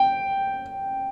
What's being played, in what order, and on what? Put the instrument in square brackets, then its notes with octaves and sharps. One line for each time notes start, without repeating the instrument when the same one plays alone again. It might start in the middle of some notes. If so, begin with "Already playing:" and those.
Already playing: [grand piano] G5